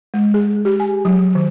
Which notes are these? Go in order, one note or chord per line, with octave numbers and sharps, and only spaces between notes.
G#3
G#4
G4
G#5
F#3
D#3